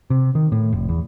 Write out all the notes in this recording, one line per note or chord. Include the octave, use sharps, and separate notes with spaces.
C3
D#3
A2
F1
E2